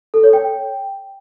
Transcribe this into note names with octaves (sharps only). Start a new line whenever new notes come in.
A4
C#5
G5